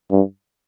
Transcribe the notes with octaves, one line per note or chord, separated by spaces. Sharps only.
G2